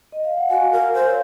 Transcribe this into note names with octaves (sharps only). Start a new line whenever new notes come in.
D#5
F5
F#5
F#4 F5 G#5
A#4
C5
C#5 F5